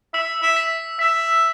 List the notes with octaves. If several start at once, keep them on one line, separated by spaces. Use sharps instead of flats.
E5 E6
E5
B6
E5 B6